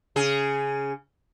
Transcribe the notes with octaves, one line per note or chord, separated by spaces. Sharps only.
C#3 G#4